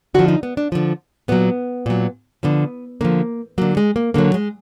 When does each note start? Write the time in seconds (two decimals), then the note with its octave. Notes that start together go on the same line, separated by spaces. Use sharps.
0.14 D3 F3 F#4
0.28 D#4
0.43 B3
0.57 D4
0.72 D3 F3
1.28 A#2 F#3 B3
1.86 A#2 F#3
2.43 D3 F3 B3
3.01 D3 F3 A#3
3.58 D3 F#3 A#3
3.77 G#3
3.96 A#3
4.14 D3 F#3 A#3
4.34 G#3